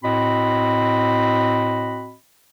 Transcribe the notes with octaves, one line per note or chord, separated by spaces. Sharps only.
A2 C4 F#4 D#5 B5